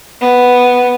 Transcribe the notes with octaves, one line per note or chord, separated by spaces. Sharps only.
B3